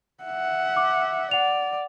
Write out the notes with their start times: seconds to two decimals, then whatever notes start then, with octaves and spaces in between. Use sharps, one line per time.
0.24 E5 F#5
0.77 D6
1.31 D5 F#5 F7